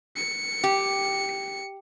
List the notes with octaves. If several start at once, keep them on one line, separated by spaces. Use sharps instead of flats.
C#7
G4